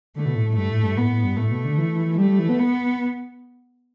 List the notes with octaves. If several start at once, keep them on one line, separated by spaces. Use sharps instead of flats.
D3 A3
B2
A2
A2
G2 A3
A2
G2
A2 B3
A2
G2
A2 A3
B2
D3
E3
E3
E3
G3 A3
G3
E3
B3
B3